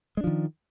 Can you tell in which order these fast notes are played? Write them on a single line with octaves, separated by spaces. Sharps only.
G#3 D4 F3 D#3